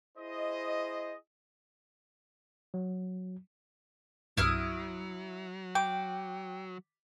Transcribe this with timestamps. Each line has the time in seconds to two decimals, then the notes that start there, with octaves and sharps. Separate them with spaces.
0.18 E4 G#4 C5 D#5
2.74 F#3
4.37 C2 G2 F#3 E4 D#6 F6
5.75 G5 D6